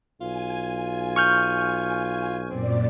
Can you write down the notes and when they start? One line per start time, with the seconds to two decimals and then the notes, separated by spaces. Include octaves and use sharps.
0.21 B1 F4 G#5
1.16 C#6 F6 G6
2.50 F#2 A#2 C4 D5